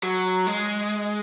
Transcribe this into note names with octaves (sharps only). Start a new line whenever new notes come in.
F#3
G#3